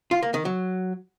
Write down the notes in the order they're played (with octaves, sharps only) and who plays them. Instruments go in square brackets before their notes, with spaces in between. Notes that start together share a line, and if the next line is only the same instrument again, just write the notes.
[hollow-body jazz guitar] F4
A#3
D#3
F#3